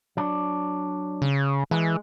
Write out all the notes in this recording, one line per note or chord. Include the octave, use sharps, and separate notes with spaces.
F#3 D4
C#3
E3 G#3